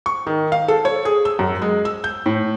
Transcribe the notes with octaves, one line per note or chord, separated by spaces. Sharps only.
C#6
D#3
F5
A4
C#5
G#4
E6
F#2
G#3
E6
G6
A2